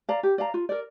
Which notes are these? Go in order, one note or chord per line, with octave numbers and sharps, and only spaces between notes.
D5 F5 A#5
G4
D5 F5 A#5
F4
A#4 D5